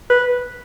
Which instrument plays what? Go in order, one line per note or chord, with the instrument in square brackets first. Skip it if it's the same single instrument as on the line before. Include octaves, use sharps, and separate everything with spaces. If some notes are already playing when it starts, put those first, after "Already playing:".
[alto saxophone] B4